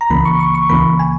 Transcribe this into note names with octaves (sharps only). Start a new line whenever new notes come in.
A#5
C#2 C#3 E3 A#3 B5
C#6
C#6
C#6
C#2 C#3 E3 A#3 B5
G#5